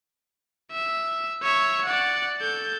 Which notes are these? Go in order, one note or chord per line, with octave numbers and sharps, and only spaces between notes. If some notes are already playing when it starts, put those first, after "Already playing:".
E5
C#5 E5
D5 F#5
A4 G6